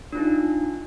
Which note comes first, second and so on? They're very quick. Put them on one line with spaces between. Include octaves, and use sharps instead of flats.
D4 F4 D#4